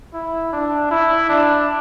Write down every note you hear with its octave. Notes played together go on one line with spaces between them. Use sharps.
E4
D4
E4
D4